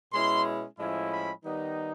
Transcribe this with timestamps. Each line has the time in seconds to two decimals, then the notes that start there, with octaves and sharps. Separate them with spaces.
0.12 B2 G#3 C#4 E4 C6
0.78 A2 F3 G#3 C#4 E4
1.12 B5
1.44 D#3 G3 B3 D#4